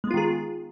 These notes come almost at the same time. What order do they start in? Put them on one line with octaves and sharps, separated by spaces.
G#3 B3 F4 D#3 G#4